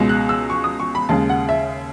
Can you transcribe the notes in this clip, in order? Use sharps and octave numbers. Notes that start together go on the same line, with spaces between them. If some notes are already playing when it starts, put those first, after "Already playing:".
Already playing: C#2 B2 G#3
F#6
E6
C#6
D#6
C#6
B5
D#2 C#3 G#3 A5
F#5
E5